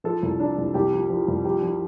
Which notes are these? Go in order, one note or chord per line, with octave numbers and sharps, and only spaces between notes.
F3 A4
C2
D4
C2
C2 G4
F3
F3
C2
F3 G4
F3